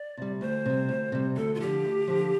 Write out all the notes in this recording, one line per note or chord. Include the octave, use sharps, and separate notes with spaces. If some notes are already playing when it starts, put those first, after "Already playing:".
Already playing: D5
C3 G3
D2 C5
C3 G3
D2
C3 G3
D2 A4
F4
D3 F3 G4
D2
D3 F3